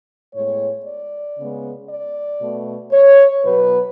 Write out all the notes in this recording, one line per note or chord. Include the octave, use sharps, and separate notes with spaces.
A2 G#3 B3 C#5
D5
C#3 G#3 B3
D5
B2 A3
C#5
B2 F#3 B3 B4